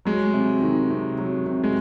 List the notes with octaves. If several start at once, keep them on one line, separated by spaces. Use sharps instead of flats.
F#3 G#3
C3
D#3
C3
F#3
C3
G#3